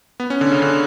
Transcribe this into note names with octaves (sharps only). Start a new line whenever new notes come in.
B3
C#4
D3
C#3
D3